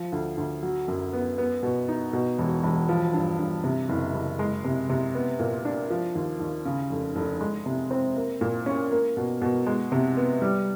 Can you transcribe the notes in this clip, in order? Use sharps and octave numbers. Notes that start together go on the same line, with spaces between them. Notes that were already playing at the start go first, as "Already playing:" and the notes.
Already playing: F3
D2
D2
F#3
F#2
B3
B3
B2
D#4
B2
E1
E1
F3
G2
G2
C3
F#1
F#1
G#3
C3
C3
B3
A#2
D4
F3
D#2
D#2
C#3
F1
F1
G#3
C3
C4
A#3
A#2
C#4
A#3
B2
B2
G#3
C3
B3
G3